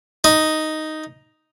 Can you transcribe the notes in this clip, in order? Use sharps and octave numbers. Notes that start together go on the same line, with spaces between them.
D#4